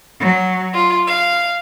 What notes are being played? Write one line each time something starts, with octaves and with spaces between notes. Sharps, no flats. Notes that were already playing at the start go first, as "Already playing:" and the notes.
F#3
F4
F5